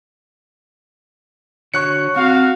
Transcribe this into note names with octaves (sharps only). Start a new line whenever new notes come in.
D3 F#4 C#5 C#6 F#6 C#7
C4 F#4 F5